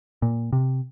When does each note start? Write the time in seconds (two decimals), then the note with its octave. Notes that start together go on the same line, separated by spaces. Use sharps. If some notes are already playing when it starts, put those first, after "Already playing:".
0.22 A#2
0.53 C3